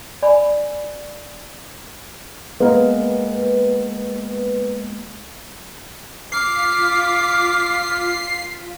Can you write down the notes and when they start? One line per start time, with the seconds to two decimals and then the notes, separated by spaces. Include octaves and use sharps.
0.23 D5 G#5 B5
2.60 G#3 A#3 B3 A#4
6.32 F4 D6 F6 B6 C7